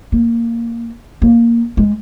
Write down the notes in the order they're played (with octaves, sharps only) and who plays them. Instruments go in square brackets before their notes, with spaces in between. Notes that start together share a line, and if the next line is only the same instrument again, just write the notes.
[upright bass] A#3
A#3
G#3